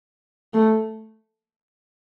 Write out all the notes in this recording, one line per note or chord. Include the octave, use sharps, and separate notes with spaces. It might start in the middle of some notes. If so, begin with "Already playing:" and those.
A3